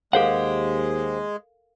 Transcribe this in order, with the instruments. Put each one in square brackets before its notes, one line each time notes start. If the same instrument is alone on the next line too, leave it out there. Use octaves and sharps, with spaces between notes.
[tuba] D#2 [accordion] G#3 [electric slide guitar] G4 C5 F#5 [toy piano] A4 A#4 F5